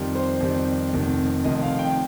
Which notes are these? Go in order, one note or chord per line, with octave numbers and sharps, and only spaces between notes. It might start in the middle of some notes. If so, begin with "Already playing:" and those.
Already playing: F2 D#3 G3
C5
F2 D#3 G3
F1 F2 D#3
F1 F2 D#3 D#5
F5
G5